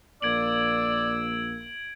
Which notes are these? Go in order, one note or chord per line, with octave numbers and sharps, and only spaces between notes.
A#1 A#3 D5 E6 G#6 D7 F#7